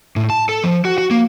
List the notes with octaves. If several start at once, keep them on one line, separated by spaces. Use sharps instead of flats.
A2
A5
A4
F3
F#4
F#4
A#3